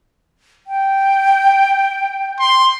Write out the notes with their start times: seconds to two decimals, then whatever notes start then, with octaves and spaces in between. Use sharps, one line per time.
0.67 G5
2.39 C6